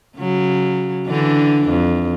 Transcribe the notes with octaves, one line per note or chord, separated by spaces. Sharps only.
C#3 F#3
D3 E3 D4
F2